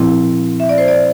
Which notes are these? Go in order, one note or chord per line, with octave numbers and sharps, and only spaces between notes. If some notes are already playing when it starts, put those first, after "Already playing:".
Already playing: A#2 F3 C4 E4
E5
D5
C5
D5